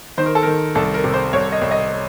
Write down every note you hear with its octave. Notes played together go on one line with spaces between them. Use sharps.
D#3 C5
A#4
A4
D#3 A#4
C2 A4
A#4
C3
C5
C2 C#5
D#5
C2
D#5